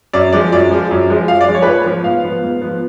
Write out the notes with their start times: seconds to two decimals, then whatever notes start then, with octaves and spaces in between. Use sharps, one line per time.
0.13 F#2 D5
0.33 F3 G#3 D5
0.52 F#2 D5
0.71 F3 G#3
0.91 F#2
1.10 F3 G#3
1.28 F#2 F5
1.41 D5
1.48 F3 G#3
1.55 C#5
1.62 B4
1.66 G#2 C#5
1.86 F3 B3
2.04 G#2 F5
2.24 F3 B3
2.44 G#2
2.62 F3 B3